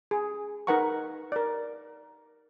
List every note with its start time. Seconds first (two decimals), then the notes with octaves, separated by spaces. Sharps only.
0.11 G#4
0.67 D#4 A#4 B4 F#5 A#5 C#6
1.32 A#4 D5